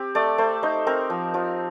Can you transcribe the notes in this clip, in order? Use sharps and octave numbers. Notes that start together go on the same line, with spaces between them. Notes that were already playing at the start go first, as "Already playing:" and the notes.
Already playing: C4 G4
A3 D5
A3 C5
D#4 C5
C4 A#4
F3
F3